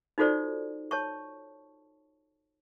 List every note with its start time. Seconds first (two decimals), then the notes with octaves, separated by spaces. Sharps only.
0.18 D#4 F4 F#4 A4 C5 D5
0.91 C#5 A5 C#6